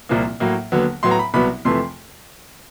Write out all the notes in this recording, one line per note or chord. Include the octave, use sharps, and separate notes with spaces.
C2 A#2 F3 A#3
A2 F#3 A#3
D#2 D3 F#3 B3
A2 F#3 B3 C6
A#5
B5
C2 B2 F#3 B3 B5
F2 C3 E3 A3 C6